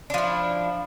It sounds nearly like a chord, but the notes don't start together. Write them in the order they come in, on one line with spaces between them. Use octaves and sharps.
D4 F3 E4